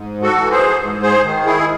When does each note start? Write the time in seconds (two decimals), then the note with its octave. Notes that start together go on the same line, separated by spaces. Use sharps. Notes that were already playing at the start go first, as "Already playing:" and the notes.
Already playing: G#2
0.22 F#4 A4
0.37 E3
0.51 G#4 C5
0.80 G#2
1.02 G#4 C5
1.24 D#3
1.46 E4 G#4